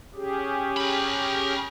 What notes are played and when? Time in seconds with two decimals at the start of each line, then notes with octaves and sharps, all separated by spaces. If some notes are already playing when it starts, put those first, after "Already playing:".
0.14 C#4 G4 G#4
0.77 A#4 B5